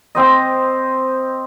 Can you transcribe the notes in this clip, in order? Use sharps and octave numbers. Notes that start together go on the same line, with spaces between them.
C4 C5 D#5